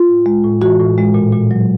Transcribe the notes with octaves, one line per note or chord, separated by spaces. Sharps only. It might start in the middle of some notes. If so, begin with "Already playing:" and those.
Already playing: F4
A2
G#3
A2
E3 F#4
A2
G#3
A#2
A#2
F#3